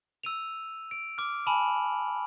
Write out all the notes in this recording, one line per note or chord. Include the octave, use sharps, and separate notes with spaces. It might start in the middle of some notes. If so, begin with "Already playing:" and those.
E6 D#7 F7
D7
D6 F6
G#5 A5 B5 F7 F#7